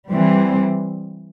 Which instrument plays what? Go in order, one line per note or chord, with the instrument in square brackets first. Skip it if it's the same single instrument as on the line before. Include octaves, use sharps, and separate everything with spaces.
[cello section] E3 G3 C4